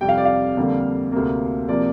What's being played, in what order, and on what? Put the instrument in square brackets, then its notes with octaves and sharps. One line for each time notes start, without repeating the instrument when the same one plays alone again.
[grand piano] F2 C3 G3 G5
F5
D5
F5
F2 D3 G3 A#3
D2 C3 A#3
C3 F3 A#3 D5